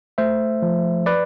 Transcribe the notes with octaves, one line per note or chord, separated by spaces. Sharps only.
A3 C5 E5
F3
B4 D5